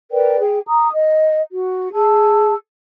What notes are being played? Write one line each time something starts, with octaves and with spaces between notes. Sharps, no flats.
A#4 B4 D5 G5
G#4 G5
A#5 D#6
D#5
F#4
G#4 A5 E6